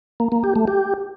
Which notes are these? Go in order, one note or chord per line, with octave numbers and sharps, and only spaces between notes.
A#3
A#3
G4
A3
G4